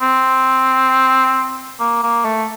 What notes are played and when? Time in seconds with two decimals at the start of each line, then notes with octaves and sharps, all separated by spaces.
0.01 C4
1.80 A#3
2.03 A#3
2.25 A3